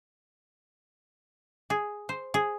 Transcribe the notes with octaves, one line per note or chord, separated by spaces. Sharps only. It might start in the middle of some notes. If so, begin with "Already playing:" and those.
G#4
C5
G#4